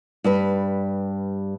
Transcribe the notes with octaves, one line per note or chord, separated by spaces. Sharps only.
G2 G3 B4